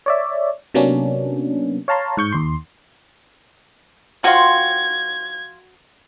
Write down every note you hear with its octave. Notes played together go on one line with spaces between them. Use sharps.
C#5 D5 E5
C3 F#3 A#3 B3 C#4 D4
C#5 F5 A5 A#5 C6
G#2 C#6 G6
D#2 C6
F3 F4 F#4 G5 C#6 G#6